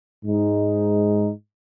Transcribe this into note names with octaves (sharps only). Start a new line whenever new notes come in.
G#2 G#3 D#4